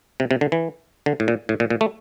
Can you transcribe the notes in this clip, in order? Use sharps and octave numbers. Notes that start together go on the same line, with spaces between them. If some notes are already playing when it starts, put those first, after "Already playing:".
C3
C3
D3
E3
D3
A2
A#2
A2
A#2
A#2
A3